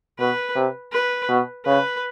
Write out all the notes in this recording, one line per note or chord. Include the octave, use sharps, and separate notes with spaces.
B2 B4
C3
B4
B2
C#3 B4